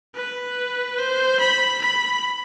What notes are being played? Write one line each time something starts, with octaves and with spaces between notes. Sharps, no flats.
B4
C5
B5
B5